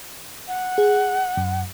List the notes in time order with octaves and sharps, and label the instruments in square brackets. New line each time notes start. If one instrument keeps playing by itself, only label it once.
[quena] F#5
[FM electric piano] G#4
F#2